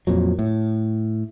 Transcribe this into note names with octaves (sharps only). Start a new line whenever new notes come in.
F2 A#2 F#3
A2